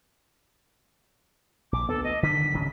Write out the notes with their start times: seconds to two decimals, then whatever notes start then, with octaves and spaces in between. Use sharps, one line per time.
1.73 A#1 D6
1.89 D2 B3 A4
2.04 D#5
2.23 D3 D#3 B6
2.53 D1 G#1 C#3